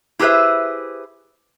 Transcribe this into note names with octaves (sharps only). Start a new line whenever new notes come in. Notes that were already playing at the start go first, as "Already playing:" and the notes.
E4 G4 G#4 B4 C5 E5